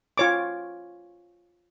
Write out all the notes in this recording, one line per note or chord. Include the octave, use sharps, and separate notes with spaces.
F4 C#5 D6